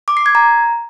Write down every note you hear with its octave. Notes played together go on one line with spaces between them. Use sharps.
D6
C7
G#6
A#5